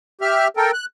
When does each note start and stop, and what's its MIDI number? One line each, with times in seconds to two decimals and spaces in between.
0.21 0.48 67
0.21 0.48 76
0.21 0.48 89
0.57 0.71 69
0.57 0.71 70
0.57 0.71 79
0.73 0.85 90